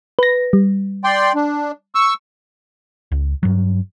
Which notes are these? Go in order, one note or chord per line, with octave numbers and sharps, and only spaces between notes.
B4 A#6
G3
D5 G5 C6
D4
C#6 E6
C#2
G2 F#3